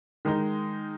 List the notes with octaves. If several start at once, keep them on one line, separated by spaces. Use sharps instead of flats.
D#3 G#3 D#4